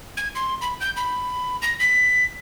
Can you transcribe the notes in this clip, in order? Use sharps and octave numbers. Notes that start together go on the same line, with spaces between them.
G#6
C6
B5
G6
B5
A#6
B6